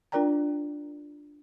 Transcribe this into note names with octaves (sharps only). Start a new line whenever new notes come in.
D4 F4 A#4 D5 G5 A#5